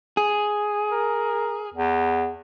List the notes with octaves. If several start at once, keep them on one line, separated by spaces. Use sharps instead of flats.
G#4
A#4
E2